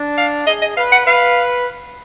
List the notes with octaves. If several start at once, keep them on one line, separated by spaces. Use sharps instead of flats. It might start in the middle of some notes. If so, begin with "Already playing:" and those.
Already playing: D4
F5
G#4 D#5
D#5
B4 F5
F#5
B4 F5